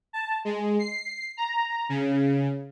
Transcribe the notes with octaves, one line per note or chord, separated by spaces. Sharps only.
A5
G#3
C7
A#5
C#3